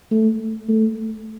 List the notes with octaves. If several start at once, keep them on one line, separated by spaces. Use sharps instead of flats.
A3
A3